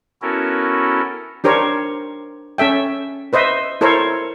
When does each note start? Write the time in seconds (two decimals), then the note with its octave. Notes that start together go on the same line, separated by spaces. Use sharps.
0.22 B3 C#4 E4 F#4 A4 A#4
1.44 D4 G4 A#4 C5 C#5
2.58 C#4 A4 E5 G5
3.33 B4 C5 D#5 E5
3.81 E4 A4 A#4 C5 C#5